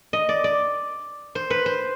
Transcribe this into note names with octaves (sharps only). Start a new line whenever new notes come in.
D#5
D5
D5
C5
B4
C5